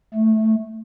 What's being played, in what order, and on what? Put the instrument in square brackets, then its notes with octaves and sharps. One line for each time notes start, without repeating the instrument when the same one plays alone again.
[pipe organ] A3